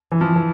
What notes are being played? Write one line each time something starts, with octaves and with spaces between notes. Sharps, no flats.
E3
F3
E3